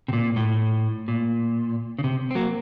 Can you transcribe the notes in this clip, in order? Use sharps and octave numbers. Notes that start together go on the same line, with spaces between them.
C3
A#2
A2
A#2
C#3
C3
C4
F#3 A#3